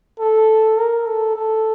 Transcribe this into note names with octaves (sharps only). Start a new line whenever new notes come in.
A4
A#4
A4
A4